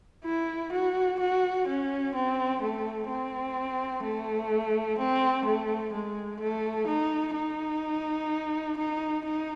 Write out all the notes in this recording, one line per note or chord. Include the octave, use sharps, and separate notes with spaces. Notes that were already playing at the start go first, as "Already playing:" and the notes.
E4
F#4
F#4
C#4
C4
A3
C4
A3
C4
A3
G#3
A3
D#4
D#4
D#4
D#4